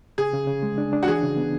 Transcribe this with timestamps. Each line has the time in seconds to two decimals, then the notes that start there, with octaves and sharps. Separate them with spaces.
0.18 C#3 G#4
0.33 C#3
0.47 C#3
0.63 G#3
0.78 D4
0.93 D4
1.03 F#4
1.07 E3 G#4
1.23 C#3
1.37 B3